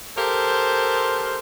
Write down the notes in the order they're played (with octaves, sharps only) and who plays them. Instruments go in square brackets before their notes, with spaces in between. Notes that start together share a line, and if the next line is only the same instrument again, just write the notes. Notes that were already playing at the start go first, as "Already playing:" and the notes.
[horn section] G4 A4 A#4 C5